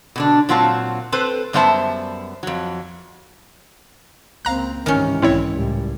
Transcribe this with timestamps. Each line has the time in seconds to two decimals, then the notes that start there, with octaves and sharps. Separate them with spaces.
0.16 B2 D3 D4
0.49 A#2 F#3 C4 F4 F#4 A5
1.12 C4 A4 B4 C5
1.53 F#2 G3 B3 C5 E5 A5
2.43 F2 F#3
4.45 C#2 A#3 C4 F5 A#5 F#6
4.86 G#2 C3 D#3 E3 C#4
5.22 B1 G#2 C4 E4 C#5
5.52 C#2 A2 G3